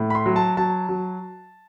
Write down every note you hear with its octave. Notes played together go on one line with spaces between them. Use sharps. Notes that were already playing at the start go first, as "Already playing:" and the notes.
Already playing: A2
B5
C6
F#3
A5
F#3 A5
F#3